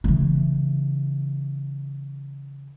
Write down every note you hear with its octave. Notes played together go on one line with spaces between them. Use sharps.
C#3 E3